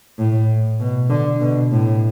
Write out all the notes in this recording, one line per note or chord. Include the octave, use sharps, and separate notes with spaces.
A2
B2
D3
B2
A2